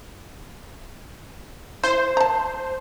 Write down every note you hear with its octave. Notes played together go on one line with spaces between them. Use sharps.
E4 C5
A5 A#5